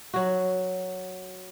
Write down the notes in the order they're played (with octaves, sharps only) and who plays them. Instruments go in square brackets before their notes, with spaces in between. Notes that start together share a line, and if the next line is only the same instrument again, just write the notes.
[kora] F#3 F#4